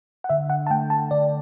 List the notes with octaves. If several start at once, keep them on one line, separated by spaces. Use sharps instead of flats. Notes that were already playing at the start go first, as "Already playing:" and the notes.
F#5
D3 E5
F#5
A5
A3 G5
A5
D3 D5